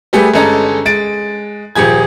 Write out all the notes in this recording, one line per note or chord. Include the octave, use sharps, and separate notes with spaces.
G3 A3 G4 G#4 B4
G1 G#3 C#4 A4 D#5 A#5
G#3 A6 D7
D#1 F3 G4 G#4 G#6